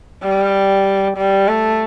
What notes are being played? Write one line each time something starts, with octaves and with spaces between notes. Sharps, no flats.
G3
G3
A3